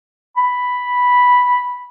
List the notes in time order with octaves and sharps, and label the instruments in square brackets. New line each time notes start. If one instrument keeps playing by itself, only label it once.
[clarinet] B5